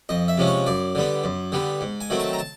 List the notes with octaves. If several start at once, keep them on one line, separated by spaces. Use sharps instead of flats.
F2 D#5
E5
C3 F3 G#3 C#4
C#5
F#2 D5
D3 G3 B3
F#2
D3 G3 B3
G#2
G#5
D#3 F#3 A3 C4
A5
A#5
A5